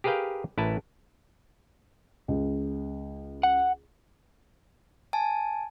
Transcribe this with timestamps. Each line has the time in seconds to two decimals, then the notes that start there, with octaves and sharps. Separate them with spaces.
0.04 G4 G#4 A#4 B4 F5 G5
0.58 A1 E4 A#4 B4 A5
2.28 C#2
3.43 F#5
5.13 G#5 A5